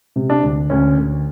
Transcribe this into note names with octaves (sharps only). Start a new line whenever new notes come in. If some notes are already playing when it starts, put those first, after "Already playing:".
C3
D4
D2
D2 C#4
D2